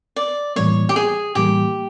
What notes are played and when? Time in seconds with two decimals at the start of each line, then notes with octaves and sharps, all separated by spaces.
0.16 D5
0.56 A2 E3 G3 A#3 C#5
0.89 G4
0.96 G#4
1.35 A2 E3 G3 A#3 G4